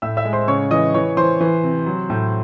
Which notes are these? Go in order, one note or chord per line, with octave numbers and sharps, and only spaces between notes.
A2 E5 E6
E5 E6
G#3
C5 C6
C#3 C#5 C#6
E3 D#5 D#6
E3 C#5 C#6
E3 C5 C6
E3
C3
F#3
A2